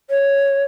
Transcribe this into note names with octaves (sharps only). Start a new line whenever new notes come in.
C#5